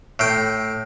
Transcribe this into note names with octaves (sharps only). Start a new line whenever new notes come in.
A2 G5